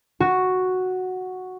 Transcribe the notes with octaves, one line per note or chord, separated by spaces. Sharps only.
F#4